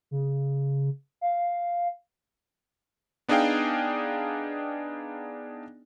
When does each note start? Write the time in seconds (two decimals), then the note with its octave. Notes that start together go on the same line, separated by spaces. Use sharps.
0.11 C#3
1.21 F5
3.28 B3 D4 D#4 G#4 F5 G5